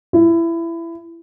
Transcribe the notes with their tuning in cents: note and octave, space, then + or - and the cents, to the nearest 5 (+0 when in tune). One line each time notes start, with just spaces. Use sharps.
E4 +20